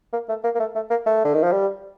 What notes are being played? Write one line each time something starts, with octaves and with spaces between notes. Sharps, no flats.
A#3
A3
A#3
A#3
A3
A3
A#3
A3
D3
D#3
F3
G3